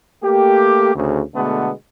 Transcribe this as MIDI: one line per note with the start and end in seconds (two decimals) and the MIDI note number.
0.22 0.93 57
0.22 0.93 58
0.22 0.93 67
0.94 1.20 38
0.94 1.20 49
1.34 1.71 47
1.34 1.71 50
1.34 1.71 56
1.34 1.71 57
1.34 1.71 59